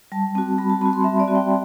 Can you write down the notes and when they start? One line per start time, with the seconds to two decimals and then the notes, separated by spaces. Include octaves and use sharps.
0.12 G3 A5
0.35 C4 F#4
0.58 G3 B5
0.70 A5
0.81 C4 F#4 B5
0.93 C6
1.04 G3 E5
1.20 D5
1.28 C4 F#4
1.35 G5